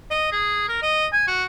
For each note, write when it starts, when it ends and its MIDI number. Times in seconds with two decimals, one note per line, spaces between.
0.11 0.29 75
0.32 0.66 68
0.69 0.81 70
0.83 1.06 75
1.13 1.27 80
1.27 1.45 66